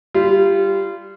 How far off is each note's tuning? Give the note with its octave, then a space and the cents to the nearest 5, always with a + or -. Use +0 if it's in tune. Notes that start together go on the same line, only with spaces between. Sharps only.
G3 +0 F4 -25